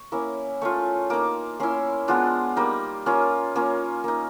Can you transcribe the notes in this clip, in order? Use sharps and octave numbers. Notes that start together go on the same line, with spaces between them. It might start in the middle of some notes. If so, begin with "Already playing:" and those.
Already playing: C#6
A#3 C#4 E4
A3 C#4 F4 C#6
A#3 D#4 D6
A#3 C#4 E4 C6
G#3 B3 D4 F4
G3 A#3 D#4 B5
A#3 C#4 F4
A#3 C#4 F4
A#3 D#4